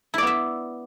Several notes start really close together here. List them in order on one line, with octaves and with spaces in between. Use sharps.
E4 D5 B3 E5